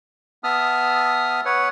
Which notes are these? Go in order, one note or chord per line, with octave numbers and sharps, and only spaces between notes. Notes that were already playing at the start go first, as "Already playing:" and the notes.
B3 E5 A5 D#6 F6
B4 C#5 F#5